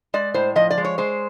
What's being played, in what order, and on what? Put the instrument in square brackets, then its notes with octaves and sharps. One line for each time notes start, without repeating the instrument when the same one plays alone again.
[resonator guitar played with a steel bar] G#3 D5
A2 C5
F3 D#5
D5
G#3
C#5
G#3 C5